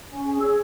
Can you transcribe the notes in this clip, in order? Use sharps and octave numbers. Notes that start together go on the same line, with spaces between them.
C#4
G#4 G#5
C#5 E6